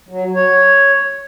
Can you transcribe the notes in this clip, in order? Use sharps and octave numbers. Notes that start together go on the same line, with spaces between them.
F#3
C#5